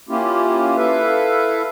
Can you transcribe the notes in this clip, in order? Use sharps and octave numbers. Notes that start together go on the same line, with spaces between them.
A#3 C#4 E4 F4 G4
E4 A4 B4 E5 F5